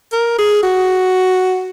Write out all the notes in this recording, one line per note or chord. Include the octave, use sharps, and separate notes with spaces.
A#4
G#4
F#4